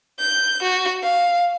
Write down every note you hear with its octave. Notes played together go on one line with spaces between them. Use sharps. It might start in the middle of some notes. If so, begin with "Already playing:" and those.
G6
F#4
F5